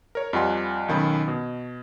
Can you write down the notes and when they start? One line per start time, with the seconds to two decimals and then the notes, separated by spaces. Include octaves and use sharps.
0.15 A#4 C#5
0.33 F2 G3 F4 F#5 G#5 C6
0.88 B1 D#3 C#4 B5
1.28 B2